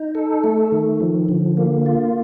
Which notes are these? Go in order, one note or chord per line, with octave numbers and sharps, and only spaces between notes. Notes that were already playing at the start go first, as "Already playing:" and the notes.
Already playing: D#4
A4
A3
D#3
F3
D3
A#3
F4